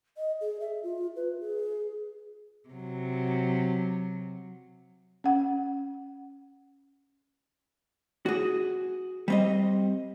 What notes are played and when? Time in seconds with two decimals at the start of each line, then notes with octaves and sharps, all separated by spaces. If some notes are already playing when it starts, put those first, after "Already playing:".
0.18 D#5
0.41 G#4
0.60 E5
0.83 F4
1.16 B4
1.40 G#4
2.69 C3 F#3
5.24 C#4 F#5
8.26 F#4 G#4
9.28 G3 C4 D#5